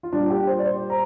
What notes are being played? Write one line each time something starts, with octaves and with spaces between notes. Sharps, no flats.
F4
A#2 G3 D4
G4
C5
D5
C5
A#5